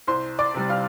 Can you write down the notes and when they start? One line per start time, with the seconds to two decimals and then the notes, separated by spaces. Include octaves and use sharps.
0.07 C2 C5 C6
0.39 D5 D6
0.54 C3 G3
0.70 F5 F6